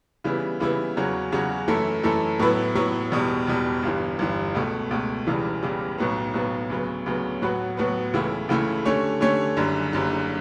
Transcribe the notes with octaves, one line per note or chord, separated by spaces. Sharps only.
C#3 E3 G3 B3 E4
C#3 E3 G3 B3 E4
E2 C#3 F#3 C#4 F#4
E2 C#3 F#3 C#4 F#4
F#2 E3 A3 E4 A4
F#2 E3 A3 E4 A4
A2 F#3 B3 E4 B4
A2 F#3 B3 E4 B4
E1 E2 B2 G3
E1 E2 B2 G3
G1 G2 E3
G1 G2 E3
C#2 B2 A3
C#2 B2 A3
E1 E2 C#3 E3 G3
E1 E2 C#3 E3 G3
B1 A2 F#3 B3
B1 A2 F#3 B3
D2 C#3 F#3 B3
D2 C#3 F#3 B3
A2 F#3 B3 F#4 B4
A2 F#3 B3 F#4 B4
C#2 C#3 E3 A3 E4
C#2 C#3 E3 A3 E4
D3 A3 C#4 G4 C#5
D3 A3 C#4 G4 C#5
F#1 F#2 D3 G3
F#1 F#2 D3 G3